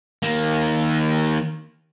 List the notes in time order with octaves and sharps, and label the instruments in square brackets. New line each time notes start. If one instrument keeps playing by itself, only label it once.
[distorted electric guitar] D#3 A#3